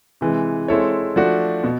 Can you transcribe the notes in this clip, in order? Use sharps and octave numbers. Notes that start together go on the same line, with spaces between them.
C3 E3 G#3
G#3 C4 E4 A4 C#5
F3 A3 D4 F#4
B2